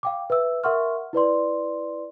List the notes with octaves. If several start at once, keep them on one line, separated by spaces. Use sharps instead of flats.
F5 G5 D6
B4 E5 E6
A#4 E5 F#5 C6 C#6 F6
E4 B4 D5 C6